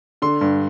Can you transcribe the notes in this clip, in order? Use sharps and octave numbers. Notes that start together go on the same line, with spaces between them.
D3 C6
G2